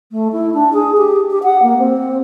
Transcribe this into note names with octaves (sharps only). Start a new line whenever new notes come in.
A3
E4
D4
G#4
G4
G4
F#5
A#3
C4